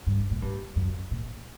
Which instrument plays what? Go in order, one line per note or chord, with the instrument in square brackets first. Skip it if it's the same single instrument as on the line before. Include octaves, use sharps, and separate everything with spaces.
[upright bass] G2
A#2
G2
F#2
A#2